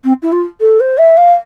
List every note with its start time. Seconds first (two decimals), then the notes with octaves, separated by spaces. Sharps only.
0.04 C4
0.22 E4
0.32 F4
0.61 A4
0.80 C5
0.98 E5
1.17 F5